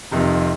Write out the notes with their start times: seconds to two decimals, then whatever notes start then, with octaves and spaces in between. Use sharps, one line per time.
0.11 F1 F2 C3 D#3